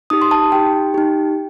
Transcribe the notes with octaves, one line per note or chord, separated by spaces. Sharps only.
D#4 G4 D#6
C6
A5
D#4 G4 G5
D#4 G4